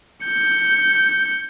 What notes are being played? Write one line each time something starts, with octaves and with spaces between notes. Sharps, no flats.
G6 C#7